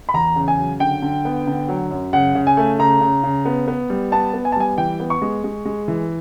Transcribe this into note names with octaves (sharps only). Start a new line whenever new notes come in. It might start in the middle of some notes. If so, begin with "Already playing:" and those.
B5
E2 A#5
C#3
G#5
F#3
D3 G5
D3
B3
D3
F#3
F#2
C#3 F#5
C#3
G#5
A3
C#3 A#5
C#3
C#3
B3
B3
G3
B3 A5
B3
G#5
A5
G3 G#5
E3 G5
B3
C#6
G#3
G#3
G#3
E3